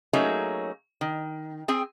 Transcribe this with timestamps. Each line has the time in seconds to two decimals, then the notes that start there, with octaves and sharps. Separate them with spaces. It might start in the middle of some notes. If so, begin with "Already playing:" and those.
0.13 F#3 A3 A#3 C#4 D#4 G#4
1.01 D#3
1.68 C4 G#4 G5